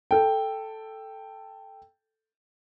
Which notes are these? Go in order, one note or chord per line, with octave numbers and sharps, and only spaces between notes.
A4 G5